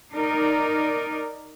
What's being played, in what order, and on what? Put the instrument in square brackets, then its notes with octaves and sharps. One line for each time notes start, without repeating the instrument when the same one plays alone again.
[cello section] D#4 A#4 D5